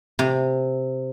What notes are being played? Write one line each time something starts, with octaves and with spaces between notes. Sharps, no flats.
C3